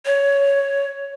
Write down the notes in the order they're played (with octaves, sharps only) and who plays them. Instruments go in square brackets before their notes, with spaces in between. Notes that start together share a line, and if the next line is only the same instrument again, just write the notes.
[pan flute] C#5